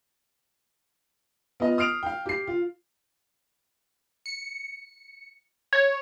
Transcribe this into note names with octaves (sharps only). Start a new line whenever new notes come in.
B3 F4 D#5
D#6 F6 C7 D7 F7
F5 G5
G4 C7
F4
C#7
C#5